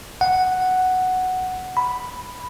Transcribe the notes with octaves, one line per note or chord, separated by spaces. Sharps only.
F#5
B5